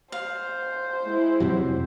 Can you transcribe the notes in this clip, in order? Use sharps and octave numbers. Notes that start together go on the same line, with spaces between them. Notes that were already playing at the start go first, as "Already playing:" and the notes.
C5 F5
G#3 E4
F2 C3 F#3